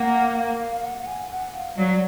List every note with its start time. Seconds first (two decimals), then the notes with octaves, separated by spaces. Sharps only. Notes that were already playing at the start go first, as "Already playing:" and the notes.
Already playing: A#3 F#5
0.36 F5
0.83 F#5
1.06 G#5
1.30 F#5
1.54 F5
1.77 F#3 D5